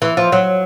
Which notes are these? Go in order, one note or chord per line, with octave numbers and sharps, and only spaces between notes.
E3
F3
F#3